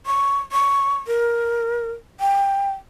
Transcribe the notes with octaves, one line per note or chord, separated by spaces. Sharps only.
C#6
C#6
A#4
G5